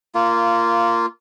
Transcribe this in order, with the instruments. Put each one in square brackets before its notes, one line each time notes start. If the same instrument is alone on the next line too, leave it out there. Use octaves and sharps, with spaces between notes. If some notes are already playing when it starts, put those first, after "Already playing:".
[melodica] A#3 F4